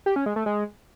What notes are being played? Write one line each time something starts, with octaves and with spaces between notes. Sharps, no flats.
G4
C#4
G#3
A3
G#3